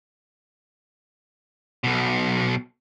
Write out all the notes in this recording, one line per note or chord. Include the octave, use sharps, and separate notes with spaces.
B1 B2